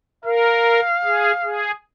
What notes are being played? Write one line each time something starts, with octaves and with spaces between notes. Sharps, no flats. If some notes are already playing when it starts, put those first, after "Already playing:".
A#4 F5
G#4
G#4